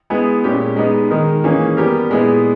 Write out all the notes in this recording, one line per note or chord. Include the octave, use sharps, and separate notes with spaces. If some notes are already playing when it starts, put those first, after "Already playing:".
G#3 B3 E4 G#4
A#2 G#3 C#4 G4
G#3 B3 D#4
D#3 G#3 D#4 A#4
E3 A#3 C#4 G#4
G3 B3 G4 A#4
A#2 G#3 B3 E4 G#4